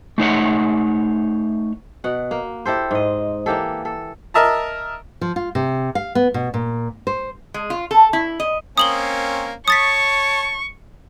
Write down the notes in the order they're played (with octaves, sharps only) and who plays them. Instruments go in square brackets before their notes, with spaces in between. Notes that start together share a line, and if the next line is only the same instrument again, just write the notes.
[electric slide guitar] A3 D#4 C#5 F#5
[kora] B2 F#5
A#3
E4 G4 A4 C5
G#2 D#5
E3 A#3 G4 A4
A4
[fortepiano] A#4 D#5 E5 A5 A#5
[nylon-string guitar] F3
F4
C3
F5
B3
B2
A#2
C5
[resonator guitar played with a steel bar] G#3
F4
A4
E4
D#5
[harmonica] A#3 C4 C#4 [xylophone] D#6 F#7 G7
[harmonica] C#5 A5 [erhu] C#6 [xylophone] D#6 A6 B6